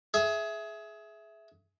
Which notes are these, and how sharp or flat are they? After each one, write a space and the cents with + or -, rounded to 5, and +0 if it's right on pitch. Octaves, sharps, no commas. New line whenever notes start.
G#4 +20 E5 +0